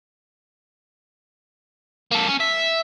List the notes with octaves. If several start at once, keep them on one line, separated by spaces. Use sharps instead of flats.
A#3 A4
C#4
E5